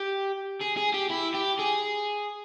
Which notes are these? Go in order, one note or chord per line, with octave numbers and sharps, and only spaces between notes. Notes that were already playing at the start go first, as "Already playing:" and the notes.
Already playing: G4
G#4
G#4
G4
E4
G4
G#4